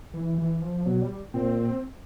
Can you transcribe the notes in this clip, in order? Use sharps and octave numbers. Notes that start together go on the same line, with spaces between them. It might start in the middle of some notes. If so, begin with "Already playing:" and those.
E3
E3
F3
B2 F#3
G3
A#2 C4